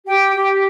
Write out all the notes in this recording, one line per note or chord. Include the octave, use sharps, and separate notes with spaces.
G4 G5
G4